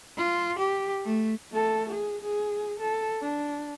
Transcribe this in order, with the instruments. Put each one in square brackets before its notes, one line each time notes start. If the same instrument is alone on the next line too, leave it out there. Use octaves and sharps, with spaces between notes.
[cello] F4
G4
A3
[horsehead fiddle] A3 A4
G#4
G#4
A4
D4